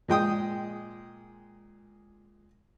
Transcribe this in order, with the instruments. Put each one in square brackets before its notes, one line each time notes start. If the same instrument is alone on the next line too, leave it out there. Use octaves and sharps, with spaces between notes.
[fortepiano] A#2 G#3 G5 D#6